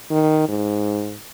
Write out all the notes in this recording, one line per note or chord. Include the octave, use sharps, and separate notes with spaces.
D#3
G#2